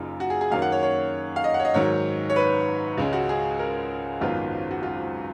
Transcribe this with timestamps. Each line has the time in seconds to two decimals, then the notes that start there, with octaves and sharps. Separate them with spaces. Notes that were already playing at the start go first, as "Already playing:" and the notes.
Already playing: F#1 F#2 C#3 D#4 F4
0.20 F#4
0.30 G#4
0.41 G#4
0.51 F#2 D#3 A#3 C#4 F5
0.62 F#5
0.72 C#5
0.83 C#5
1.36 F5
1.44 D#5
1.54 F#5
1.59 C#5
1.65 D#5
1.74 G#2 D#3 F#3 C#5
2.30 C#5
2.36 B4
2.97 C#2 C#3 G#3 C#4
3.13 F#4
3.29 G#4
3.59 A#4
4.21 G#1 F#2 D#3 F#3 B3 F4
4.71 F#4
4.83 F4